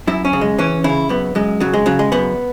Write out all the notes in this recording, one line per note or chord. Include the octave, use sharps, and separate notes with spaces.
F#2 E4
C#4
C#3
G#3
E3 C#4
C#3 E4
F#2 B3
F#2 G#3
C#3 F#3
G#3
C#3 F#3
G#3
F#2 B3